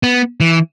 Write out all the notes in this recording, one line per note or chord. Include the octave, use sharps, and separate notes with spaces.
B3
E3